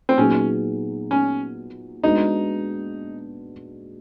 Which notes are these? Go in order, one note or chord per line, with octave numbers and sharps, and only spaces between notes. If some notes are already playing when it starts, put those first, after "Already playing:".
C4
A#2 F#3 B3 C#4 D#4 G#4
C#4
G#3 B3 D4 D#4 F#4